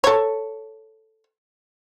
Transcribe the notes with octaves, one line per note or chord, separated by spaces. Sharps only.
A4 C#5